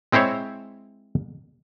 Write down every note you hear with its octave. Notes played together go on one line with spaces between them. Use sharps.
G#3 C4 E4 C5 C#5